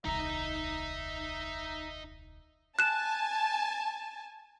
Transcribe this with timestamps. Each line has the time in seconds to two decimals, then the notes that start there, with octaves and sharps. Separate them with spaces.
0.05 D#1 C2 D#4 E5 A#5
2.79 G#5 A5 F#6 E7